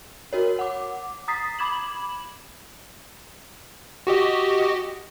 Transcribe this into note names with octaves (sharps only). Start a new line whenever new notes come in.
F#4 A#4 C#5
F#5 D6
A#5 D#6 A6 B6 C7
B5 D6 G#6 E7 F#7
F#4 G4 D#5